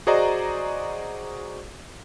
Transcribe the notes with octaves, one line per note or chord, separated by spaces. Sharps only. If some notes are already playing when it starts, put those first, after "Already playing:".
F#4 G#4 C5 D5 D#5 A#5